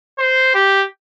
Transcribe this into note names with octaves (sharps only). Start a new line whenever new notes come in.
C5
G4